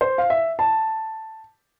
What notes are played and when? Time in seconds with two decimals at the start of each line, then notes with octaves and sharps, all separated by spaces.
0.01 C5
0.18 F5
0.30 E5
0.59 A5